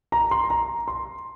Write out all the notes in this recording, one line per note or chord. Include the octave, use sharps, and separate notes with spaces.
A#5
C6
A#5
C6